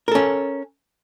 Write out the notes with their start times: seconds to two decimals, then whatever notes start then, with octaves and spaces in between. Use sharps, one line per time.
0.08 A#4
0.12 A4
0.15 C#4